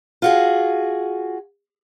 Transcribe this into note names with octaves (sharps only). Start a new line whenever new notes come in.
F4 F#4 G#4